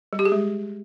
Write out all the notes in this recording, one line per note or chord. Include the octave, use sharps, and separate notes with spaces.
G3
G4
G#4
G#3